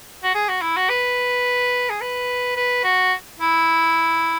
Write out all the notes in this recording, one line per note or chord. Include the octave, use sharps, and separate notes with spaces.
F#4
G#4
F#4
E4
F#4
B4
G#4
B4
B4
F#4
E4